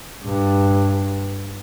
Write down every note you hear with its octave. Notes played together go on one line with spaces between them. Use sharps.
G2